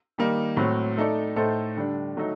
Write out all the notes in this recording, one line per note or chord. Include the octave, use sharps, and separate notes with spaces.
D#3 G3 A#3 D#4
A2 F#3 C4
A3 D#4 A4 D5
A2 A3 D#4 A4 C5
D3 G3 D4
F#3 A3 D#4